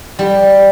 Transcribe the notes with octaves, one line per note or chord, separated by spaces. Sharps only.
G3